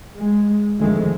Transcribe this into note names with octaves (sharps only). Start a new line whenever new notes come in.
G#3
F2 A2 D3 D#3 G#3 A3